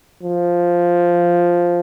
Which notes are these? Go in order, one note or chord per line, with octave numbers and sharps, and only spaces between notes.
F3